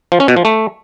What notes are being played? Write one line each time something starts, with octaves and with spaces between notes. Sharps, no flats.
F3
C#4
B2
F3
A3